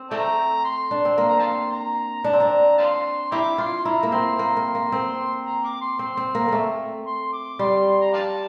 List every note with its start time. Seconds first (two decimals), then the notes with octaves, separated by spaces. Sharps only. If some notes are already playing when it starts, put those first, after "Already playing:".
Already playing: C4
0.11 A3 D5 G5 A#5
0.64 C6
0.91 D4
1.05 C4
1.18 A#3 C6
1.28 A#5
1.39 F5 A5 C6
1.72 A#5
2.24 D4 A#5
2.33 C4
2.40 D4
2.78 F5 A5 C6
3.32 E4 G5 A#5 D6
3.58 F4 C6
3.85 E4 A#5
4.03 A#3
4.12 C4 C6
4.39 A#3
4.57 A#3
4.75 A#3
4.92 C4
5.46 A#5
5.64 D6
5.81 C6
5.99 C4 C6
6.17 C4
6.35 A#3
6.48 A3 A#3
7.06 C6
7.32 D6
7.59 G3 C6
7.88 C6
8.01 A#5
8.13 D5 F5 A5